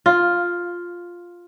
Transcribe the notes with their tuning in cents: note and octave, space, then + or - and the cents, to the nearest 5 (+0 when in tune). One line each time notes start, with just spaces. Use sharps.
F4 +5